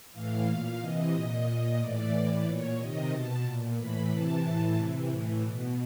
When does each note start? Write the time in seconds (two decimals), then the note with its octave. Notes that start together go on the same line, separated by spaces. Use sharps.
0.12 A2 E3 F5
0.45 A#2 F5
0.79 C3 E3 D#5
1.11 A#2
1.45 A#2
1.79 A2 E3 D5
2.11 A2 E3
2.44 A#2 C#5
2.77 C3 D#3 D#5
3.10 B2 A5
3.43 A#2
3.76 A2 E3 B5
4.10 C3 E3 A5
4.43 A2 E3
4.76 C3 E3
5.09 A2 E3
5.42 B2